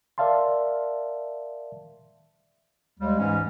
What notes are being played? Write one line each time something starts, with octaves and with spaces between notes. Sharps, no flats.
A#4 D5 E5 F5 A5 C6
D#2 G3 G#3
G#2 E3 C#4